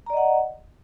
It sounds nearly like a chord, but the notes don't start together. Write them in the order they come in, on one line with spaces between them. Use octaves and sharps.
A#5 D5 D#5 F#5